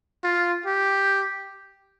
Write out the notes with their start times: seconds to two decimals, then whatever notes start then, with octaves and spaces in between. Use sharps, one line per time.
0.24 F4
0.66 G4